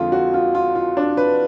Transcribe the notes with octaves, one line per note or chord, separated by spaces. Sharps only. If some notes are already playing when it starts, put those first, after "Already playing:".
Already playing: F2 D3 G#3 F4
F#4
F4
F4
F4
D4
B4